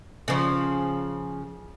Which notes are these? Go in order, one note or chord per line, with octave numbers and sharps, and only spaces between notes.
C#3 F3